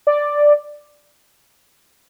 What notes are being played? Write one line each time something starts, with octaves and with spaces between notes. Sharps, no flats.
D5